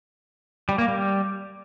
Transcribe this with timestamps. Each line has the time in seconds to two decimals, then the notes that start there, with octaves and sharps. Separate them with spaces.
0.69 G3
0.78 A#3
0.88 G3